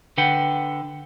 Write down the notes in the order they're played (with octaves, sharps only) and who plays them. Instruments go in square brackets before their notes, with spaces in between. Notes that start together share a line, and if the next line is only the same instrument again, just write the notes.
[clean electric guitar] D3 B4 F#5 G5